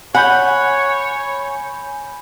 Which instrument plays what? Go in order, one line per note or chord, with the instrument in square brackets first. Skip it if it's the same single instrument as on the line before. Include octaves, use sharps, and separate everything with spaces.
[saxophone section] C#5 [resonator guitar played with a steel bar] F#5 [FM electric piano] G#5 B5 G6